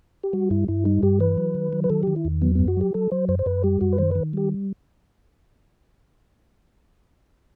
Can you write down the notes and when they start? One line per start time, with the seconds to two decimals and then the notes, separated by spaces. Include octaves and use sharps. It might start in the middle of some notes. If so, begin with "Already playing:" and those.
0.24 G4
0.33 G3 F#4
0.50 G2 E4
0.68 G2 E4
0.85 G3 D#4
1.03 G2 G4
1.20 E3 B4
1.38 F#3
1.55 D#3
1.73 F#3
1.84 B4
1.90 D#3 A4
2.03 D#3 G4
2.16 E4
2.25 E2
2.42 F#3 B3
2.55 F#2 B3
2.68 F#4
2.77 F#3 G4
2.94 F#3 A4
3.11 F#3 C5
3.28 F#2 C5
3.39 C5
3.46 F#2 B4
3.64 G3 G4
3.81 F#2 F#4
3.93 B4
3.98 D#3 C5
4.11 D#3 B4
4.33 G3 G4